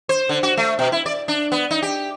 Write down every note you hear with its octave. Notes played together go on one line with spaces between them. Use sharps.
C5
D3
F#4
A3
B2
E4
D5
D4
B3
D#4
G4